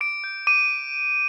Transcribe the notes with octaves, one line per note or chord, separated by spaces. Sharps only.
D6 D7
G6
D6 D#7